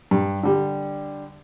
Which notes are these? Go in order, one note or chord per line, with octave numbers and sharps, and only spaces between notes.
G2
D3 G3